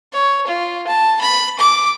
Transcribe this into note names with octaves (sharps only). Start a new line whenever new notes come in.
C#5
F4
A5
B5
D6